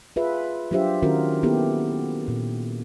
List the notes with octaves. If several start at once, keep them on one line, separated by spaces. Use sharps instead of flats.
F4 G#4 B4 E5
F#3 D4 F4 G4 C5 E5
D#3 C#4 F4 F#4 A#4
A#3 B3 E4 G4 A4
A#2